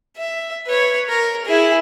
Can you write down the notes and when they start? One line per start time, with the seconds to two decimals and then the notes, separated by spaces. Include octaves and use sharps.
0.17 E5
0.67 B4 C#5
1.09 A#4
1.45 E4 G#4